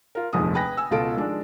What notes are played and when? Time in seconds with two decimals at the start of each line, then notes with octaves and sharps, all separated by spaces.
0.15 F4 A#4
0.33 F1 A#1 D#2 G#3 D#4 D#6
0.55 B4 G5 G#5 A#6
0.77 G#5 E6
0.91 C#2 B2 F4 A4 D7
1.16 D#3 F3 G#3 D4